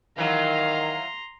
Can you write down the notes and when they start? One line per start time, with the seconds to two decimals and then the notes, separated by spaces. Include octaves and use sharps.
0.18 D#3 E3 F#3 F5 A#5 C6